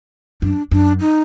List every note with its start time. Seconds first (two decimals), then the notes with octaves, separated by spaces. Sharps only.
0.42 F#2 D4
0.71 F#2 D4
1.00 D#4